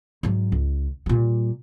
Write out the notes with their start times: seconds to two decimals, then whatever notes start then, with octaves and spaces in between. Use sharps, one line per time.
0.23 G#2 F#3
0.52 C#2
1.06 A#2 G3